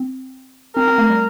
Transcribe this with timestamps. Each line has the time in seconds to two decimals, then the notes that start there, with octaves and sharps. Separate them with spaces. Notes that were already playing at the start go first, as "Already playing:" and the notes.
Already playing: C4
0.76 C4 A#4
0.88 C4
0.98 A3
1.10 G3